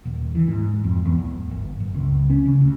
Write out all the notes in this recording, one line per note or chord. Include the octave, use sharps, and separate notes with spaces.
D#1
E3
G#2
F2
E2
D1
G1
F#1
C#2
C#4
C#3
D2